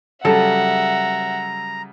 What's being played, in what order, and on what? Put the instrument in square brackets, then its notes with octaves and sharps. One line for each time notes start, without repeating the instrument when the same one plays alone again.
[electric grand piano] C#3 F#3 G3 [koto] A4 [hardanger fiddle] E5 F#5 [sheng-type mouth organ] A#5